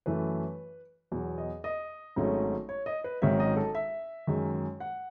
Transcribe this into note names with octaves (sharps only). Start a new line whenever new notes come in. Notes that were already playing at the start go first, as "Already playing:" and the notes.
F#2 E3 A3 B4
E2 B2 F#3
D#5
D#5
G#1 G#2 F#3 A3 C#4
C#5
D#5
B4
G#1 G#2 D#3 F#3 C#4 E5
D#5
A4
E5
F#2 D#3 G#3
F#5